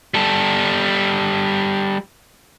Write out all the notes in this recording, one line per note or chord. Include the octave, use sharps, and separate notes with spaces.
G3 A4